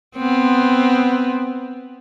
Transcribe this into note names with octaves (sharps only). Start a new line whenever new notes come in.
B3 C4